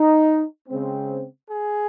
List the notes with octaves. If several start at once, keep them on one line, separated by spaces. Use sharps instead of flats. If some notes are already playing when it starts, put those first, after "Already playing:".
Already playing: D#4
C#3 G#3 C4
G#4